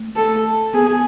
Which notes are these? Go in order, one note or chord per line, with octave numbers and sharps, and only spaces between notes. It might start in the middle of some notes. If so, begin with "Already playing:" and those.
Already playing: A3
A4
B3 G#4